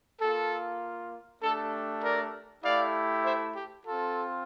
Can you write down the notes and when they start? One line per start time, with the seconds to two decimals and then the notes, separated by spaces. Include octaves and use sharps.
0.20 A#3 F4 A4
1.42 A3 D4 G4 A4
2.03 A#4 D5
2.64 A3 E4 G4 D5 F5
3.24 C5 E5
3.55 G4
3.86 C4 F4 A4